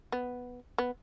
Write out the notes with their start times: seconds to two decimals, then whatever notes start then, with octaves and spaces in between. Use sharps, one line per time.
0.12 B3
0.78 B3